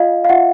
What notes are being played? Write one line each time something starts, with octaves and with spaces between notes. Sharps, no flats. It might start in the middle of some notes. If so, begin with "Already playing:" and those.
Already playing: F4 D#5 F5
F5
F4 E5 F#5